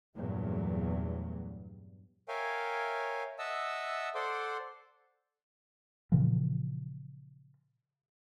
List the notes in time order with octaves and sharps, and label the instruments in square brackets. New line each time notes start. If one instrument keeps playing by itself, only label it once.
[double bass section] E2 G2 A#2 F#3 A3
[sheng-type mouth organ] A#4 C#5 E5 F5 G5 G#5
D#5 E5 F#5 A5 E6
A4 C5 D5 F#5 C6 D6
[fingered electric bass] A#2 C#3 E3 F3